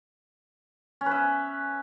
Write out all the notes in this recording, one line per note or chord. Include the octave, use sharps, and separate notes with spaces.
C#4
B4
E5